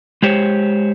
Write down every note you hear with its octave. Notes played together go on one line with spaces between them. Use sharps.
G#3 G4 C5 C#5